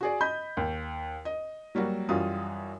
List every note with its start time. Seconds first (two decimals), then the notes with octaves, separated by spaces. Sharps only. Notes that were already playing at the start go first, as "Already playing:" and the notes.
0.01 F#4 G#4 D5
0.21 D#5 B5 G6
0.57 D#2
1.25 D#5
1.75 F#3 G3 A#3 F#4
2.09 F#2 E3 G3 F4 F#4 D#6